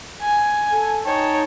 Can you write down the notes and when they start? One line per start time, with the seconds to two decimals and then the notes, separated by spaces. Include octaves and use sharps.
0.22 G#5
0.72 A4
1.06 D#4 C#5 G5 A5